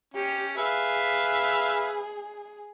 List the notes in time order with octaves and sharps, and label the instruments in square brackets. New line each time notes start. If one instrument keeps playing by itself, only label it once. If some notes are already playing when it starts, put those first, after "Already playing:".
[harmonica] C#4 [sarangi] G4
[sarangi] G#4 [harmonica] B4 E5 F5